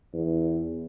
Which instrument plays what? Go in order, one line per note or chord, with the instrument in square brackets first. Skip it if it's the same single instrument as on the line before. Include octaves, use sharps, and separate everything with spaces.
[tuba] E2